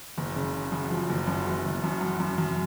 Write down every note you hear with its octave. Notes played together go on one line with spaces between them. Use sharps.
F#1
C#3
C#3
F#2
F3
F#1
F#2
F#1
F#1
F#2
F#2
F#2
F#2